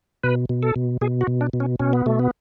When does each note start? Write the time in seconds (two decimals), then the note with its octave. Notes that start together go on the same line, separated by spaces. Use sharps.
0.23 B2 B4
0.49 B2
0.63 A4
0.76 B2
1.01 B2 G#4
1.21 F#4
1.27 B2
1.41 D4
1.53 B2
1.60 C#4
1.79 B2 C#4
1.93 B3
2.06 B2 A3
2.19 B3